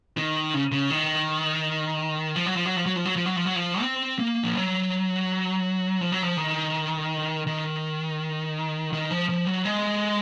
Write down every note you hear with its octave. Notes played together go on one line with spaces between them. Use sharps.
D#3
C#3
C#3
D#3
F3
F#3
F3
F#3
F3
F#3
F3
F#3
F3
F#3
F3
F#3
F3
C4
A#3
F3
F#3
F3
F#3
F3
D#3
D#3
D#3
F3
F3
F#3
G#3